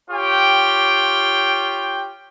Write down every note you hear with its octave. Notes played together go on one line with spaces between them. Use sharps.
F4 G4 C#5 G5